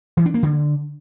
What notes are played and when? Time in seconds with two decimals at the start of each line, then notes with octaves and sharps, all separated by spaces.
0.17 E3
0.26 D4
0.34 A#3
0.43 D3